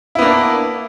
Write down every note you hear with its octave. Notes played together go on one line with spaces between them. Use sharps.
A#3 B3 D4 E4